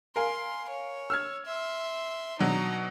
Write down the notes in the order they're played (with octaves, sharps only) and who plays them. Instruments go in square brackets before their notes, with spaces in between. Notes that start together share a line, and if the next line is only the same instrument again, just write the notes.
[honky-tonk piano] A#4 F5 G#5 [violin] C6
[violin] C#5
[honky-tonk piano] E6 F6 G#6
[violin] E5 C6
[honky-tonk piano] B2 F#3 D4 [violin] D#4 A#5